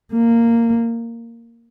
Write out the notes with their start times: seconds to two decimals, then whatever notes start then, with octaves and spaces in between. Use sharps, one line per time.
0.13 A#3